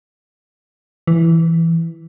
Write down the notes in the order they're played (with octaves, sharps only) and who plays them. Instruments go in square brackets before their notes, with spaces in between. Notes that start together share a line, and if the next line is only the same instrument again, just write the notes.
[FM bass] E3